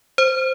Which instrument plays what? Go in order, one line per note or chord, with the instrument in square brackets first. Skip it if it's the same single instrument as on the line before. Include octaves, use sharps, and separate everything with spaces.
[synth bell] C5